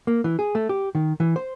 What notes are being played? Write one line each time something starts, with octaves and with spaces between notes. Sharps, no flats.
A#3
E3
G#4
A3
G4
D#3
E3
C5